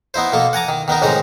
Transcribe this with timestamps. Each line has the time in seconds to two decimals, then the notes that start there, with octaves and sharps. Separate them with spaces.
0.14 B3 D#4 E4 C5
0.32 B2 A#3 A4
0.53 F#5 G#5 A#5 D6
0.69 D#3
0.88 D#3 B3 D#4 A#4
1.02 A1 C3 D#3 G#3 D#4 A#5